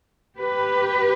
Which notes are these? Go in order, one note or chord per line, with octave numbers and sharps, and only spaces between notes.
G4 B4